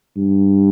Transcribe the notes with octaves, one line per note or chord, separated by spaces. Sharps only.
G2